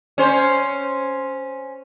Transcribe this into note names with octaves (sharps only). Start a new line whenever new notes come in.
C#4 C5